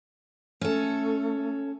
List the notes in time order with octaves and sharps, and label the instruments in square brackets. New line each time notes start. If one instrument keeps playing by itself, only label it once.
[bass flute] A3 [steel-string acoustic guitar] C#4 A4